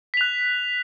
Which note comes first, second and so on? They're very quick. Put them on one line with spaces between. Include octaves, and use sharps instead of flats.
B6 F7 F#6